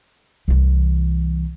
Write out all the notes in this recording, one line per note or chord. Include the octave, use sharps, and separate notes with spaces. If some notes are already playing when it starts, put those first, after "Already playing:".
C2 E3